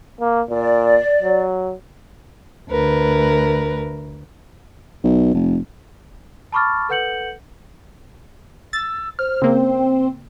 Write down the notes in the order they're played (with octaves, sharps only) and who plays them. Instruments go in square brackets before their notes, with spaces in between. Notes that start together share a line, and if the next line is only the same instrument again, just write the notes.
[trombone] A#3
[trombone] A#2 [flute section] D5
[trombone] F#3
[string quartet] D2 A#4 B4
[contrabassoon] B1
F1
[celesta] A5 B5 C#6 D6 F6 A6
A4 B4 F#5 G6 C#7 F#7
[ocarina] E6 [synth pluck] A6
[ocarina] C5 [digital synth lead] F6
[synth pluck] C#3 A#3 [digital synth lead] C4